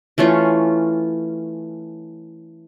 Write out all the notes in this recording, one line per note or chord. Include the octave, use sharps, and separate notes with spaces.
E3 A3 C#4 F4